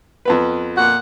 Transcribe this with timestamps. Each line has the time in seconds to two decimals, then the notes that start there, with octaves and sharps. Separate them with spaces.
0.25 F2 B3 B4
0.76 A#2 F#5